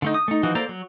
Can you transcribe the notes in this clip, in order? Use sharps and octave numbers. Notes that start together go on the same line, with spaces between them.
D3 A3 D#4
D#6
A3 D#4
E3 F3 D#4 F#4
A#3 A4 C5 D5 A#5
F#3